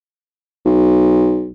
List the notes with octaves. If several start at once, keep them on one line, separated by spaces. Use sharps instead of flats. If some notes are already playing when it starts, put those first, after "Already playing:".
B1